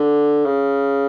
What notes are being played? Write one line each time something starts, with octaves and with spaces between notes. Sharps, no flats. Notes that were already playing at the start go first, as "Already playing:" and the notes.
Already playing: D3
C#3